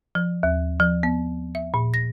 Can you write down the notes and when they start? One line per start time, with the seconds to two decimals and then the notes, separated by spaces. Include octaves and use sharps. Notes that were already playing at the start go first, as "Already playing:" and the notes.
0.15 F3
0.43 D#2
0.80 F3
1.03 B3
1.55 E5
1.74 A#2
1.94 A#6